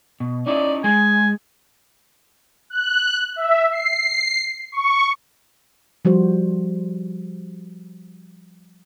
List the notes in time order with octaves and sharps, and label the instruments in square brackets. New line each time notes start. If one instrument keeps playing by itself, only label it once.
[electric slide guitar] B2
[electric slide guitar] C#4 D#4 E4 [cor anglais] D5
[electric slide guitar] G#3 [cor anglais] G#5
[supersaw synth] F#6
E5
C7
C#6
[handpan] F3 G3 F#4 C5